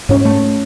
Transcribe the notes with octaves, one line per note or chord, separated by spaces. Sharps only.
G#2 C#4
A3